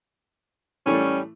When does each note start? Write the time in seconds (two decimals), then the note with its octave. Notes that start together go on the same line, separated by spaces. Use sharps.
0.86 A2 E3 G3 A3 C#4